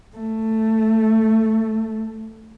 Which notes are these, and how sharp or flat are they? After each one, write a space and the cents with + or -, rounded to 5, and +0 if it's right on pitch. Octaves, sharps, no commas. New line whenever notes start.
A3 +10